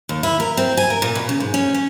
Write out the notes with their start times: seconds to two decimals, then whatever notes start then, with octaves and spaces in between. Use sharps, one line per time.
0.09 D#2
0.23 E4
0.40 A#4
0.57 C4
0.77 G#5
0.90 A#4
1.02 A#2
1.15 B2
1.29 C#3
1.40 G#2
1.54 C#4
1.74 C#4